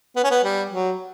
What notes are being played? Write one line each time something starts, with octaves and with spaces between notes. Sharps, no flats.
B3
C#4
B3
G3
F#3